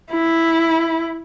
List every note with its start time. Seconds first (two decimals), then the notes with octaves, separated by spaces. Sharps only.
0.11 E4